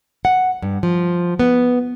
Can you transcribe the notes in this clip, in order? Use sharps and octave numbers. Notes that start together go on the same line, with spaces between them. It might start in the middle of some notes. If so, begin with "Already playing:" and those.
F#5
G2
F3
B3